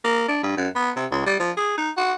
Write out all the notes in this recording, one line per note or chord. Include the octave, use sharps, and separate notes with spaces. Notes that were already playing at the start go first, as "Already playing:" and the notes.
A#3
D4
G2
F#2
B3
C3
C#2
G3
F3
G#4
D#4
F#4